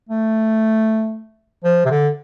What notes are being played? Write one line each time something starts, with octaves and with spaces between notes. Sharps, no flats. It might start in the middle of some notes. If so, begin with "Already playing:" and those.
A3
F3
C3
D3